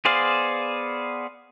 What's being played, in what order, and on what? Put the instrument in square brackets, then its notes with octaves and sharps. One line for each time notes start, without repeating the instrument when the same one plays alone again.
[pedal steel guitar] B3 G#4 C5 D5 F5